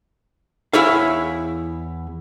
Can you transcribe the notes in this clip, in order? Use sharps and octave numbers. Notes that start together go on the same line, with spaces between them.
E2 E4 G#4 C#5 F5